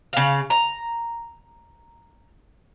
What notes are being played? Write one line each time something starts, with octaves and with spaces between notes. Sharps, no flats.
C#3 F5
A#5